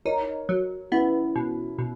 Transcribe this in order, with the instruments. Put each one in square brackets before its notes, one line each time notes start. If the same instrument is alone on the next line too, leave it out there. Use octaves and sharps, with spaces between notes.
[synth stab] D#4 [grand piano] A#4 C#5
[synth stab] F#3
[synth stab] B3 [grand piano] C#4 E4
[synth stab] B2
B2